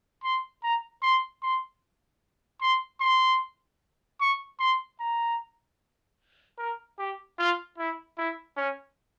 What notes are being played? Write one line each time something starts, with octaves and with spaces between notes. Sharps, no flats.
C6
A#5
C6
C6
C6
C6
C#6
C6
A#5
A#4
G4
F4
E4
E4
C#4